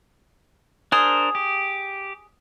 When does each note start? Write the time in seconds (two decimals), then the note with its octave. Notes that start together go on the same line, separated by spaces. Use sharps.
0.92 D4 G#4 A#4 C5
1.35 G4